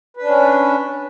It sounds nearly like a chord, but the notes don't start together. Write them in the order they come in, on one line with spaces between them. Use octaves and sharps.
B4 D4 C#4